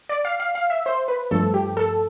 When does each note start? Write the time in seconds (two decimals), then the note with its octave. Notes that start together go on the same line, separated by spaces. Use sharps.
0.09 D5
0.25 F5
0.40 F5
0.55 F5
0.70 E5
0.86 C5
1.08 B4
1.31 G2 F3 A3 A4
1.54 G4
1.77 A4